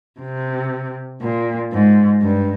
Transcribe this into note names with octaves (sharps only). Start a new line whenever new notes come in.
C3
A#2
G#2
G2